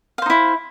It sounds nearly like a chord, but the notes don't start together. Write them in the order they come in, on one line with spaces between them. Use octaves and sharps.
F5 C5 D#4 E4